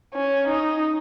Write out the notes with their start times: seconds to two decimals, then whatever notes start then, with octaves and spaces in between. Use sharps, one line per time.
0.14 C#4
0.47 D#4